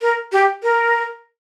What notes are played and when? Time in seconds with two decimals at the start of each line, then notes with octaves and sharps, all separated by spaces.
0.02 A#4
0.32 G4
0.63 A#4